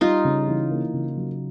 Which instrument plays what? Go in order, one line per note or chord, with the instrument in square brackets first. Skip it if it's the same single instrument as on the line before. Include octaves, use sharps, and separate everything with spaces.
[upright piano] G3 [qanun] D#4 F4
[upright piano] C#3
E3
A#3
C#3
F#3